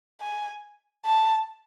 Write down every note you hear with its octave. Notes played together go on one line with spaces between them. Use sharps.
G#5
A5